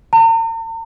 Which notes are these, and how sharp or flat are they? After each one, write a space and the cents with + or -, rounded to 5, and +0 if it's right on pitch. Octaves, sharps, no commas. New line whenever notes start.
A#5 -45